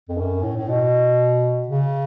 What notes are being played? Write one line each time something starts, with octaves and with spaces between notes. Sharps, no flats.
F2
F#2
A2
A2
B2
C#3